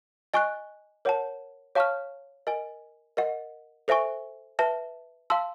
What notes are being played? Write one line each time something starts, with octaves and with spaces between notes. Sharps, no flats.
D#5 G#5 C#6 F#6
A#4 C#5 F#5 A5
C#5 F5 A5 C#6 F6
A#4 D#5 G#5
A#4 D#5 F#5
A4 C5 E5 G#5 C#6
B4 E5 A5
F5 A5 C6 E6